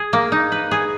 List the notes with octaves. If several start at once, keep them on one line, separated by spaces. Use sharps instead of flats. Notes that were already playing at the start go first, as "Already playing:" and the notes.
Already playing: G#4
A#3
D#4
B4
G#4